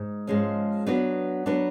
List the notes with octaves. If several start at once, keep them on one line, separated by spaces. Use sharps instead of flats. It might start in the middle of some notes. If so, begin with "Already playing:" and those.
Already playing: G#2
G#2 F3 G#3 C#4
F#3 B3 D4 F#4 B4
F#3 B3 D4 F#4 B4